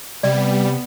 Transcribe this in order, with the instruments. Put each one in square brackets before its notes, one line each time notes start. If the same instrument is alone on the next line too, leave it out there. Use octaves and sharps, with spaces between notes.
[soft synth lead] C3 [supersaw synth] G3 [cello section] B3 [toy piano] D5